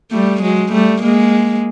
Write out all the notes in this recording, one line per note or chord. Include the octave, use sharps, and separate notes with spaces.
G3 A3
F#3 G#3
G3 A3
G#3 A#3